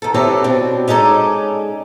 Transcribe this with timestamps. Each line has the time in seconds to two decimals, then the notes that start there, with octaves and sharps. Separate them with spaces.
0.02 D#3 A4
0.14 C4 E4 G4 A4 B4 C#5
0.44 B2 C4 D4
0.88 G#3 C#4 D#4 A4 D5